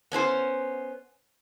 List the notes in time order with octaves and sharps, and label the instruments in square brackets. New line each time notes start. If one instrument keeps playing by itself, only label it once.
[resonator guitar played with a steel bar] B3 C#4 G4 C5